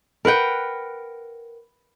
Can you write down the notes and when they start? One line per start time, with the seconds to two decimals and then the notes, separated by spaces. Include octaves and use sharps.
0.25 A#4 B4 F#5 G5